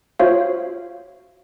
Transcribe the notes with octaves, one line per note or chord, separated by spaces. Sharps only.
F4 F#4 C5 C#5 E5 F5